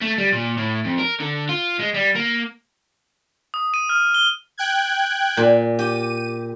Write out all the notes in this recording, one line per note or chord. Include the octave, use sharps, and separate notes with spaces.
A3
G3
A#2
A2
F2
A#4
D3
F4
G#3
G3
A#3
D#6
D#7
F6
G7
G5 F#6 G#6
A#2
G4 D#7